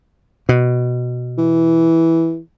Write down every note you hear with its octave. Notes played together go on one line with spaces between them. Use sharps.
B2
E3